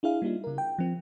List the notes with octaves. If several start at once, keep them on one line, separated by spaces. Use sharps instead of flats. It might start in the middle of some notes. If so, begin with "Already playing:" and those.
D4 E4 G#4 F5
G3 A#3 D4 D#4 F4
C#3 A#4
G5
F3 C4